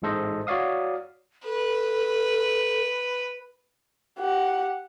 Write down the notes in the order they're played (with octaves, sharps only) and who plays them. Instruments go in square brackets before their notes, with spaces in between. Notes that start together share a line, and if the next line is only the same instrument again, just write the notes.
[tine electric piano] A1 G#2 G#3 A4 C5 D#5
F#4 C#5 D5 F5 D#6
[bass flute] A4 [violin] B4
[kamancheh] G4 F#5